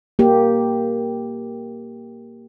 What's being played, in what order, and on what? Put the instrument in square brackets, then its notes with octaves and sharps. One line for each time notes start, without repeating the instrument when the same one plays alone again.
[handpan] A#3 G4